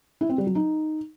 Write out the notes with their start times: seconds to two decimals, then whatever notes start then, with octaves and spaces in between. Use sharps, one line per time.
0.21 E4
0.29 C4
0.38 G3
0.47 F#3
0.55 D#4